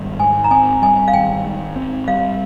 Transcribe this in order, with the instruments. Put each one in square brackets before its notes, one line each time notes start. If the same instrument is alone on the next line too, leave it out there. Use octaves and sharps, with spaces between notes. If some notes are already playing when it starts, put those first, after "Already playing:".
Already playing: [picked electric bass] G#1 G3
[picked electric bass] G#2 [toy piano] G#5
[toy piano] A#5
[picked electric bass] C4 [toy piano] G#5
[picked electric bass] G3 [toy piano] G#5
[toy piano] F5
[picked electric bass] G#1 [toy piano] G5
[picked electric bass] G#2
C4
[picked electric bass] G3 [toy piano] F5